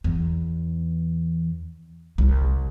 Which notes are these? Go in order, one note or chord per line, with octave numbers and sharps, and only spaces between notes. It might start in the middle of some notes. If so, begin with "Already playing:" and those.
E2
C2